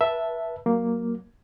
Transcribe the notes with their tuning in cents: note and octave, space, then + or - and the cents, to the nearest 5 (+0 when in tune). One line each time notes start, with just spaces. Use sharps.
B4 -30 E5 +0 A5 +0
F#3 +0 A#3 +0